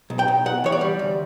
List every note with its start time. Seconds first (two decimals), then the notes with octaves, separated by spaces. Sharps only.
0.10 B1
0.19 G5
0.28 B1
0.46 B1 F#5
0.64 E3 C#5
0.72 D5
0.81 G3
0.99 D2